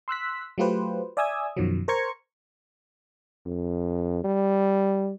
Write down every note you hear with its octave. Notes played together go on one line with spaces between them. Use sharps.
C6 E6 F#6 B6
F#3 A3 F4 G4 B4 C5
D5 E5 G#5 D#6 E6 G#6
F#2 B2 D#3 F3 F#3
A#4 C5 A#5 C#6 G#6 C#7
F2
G3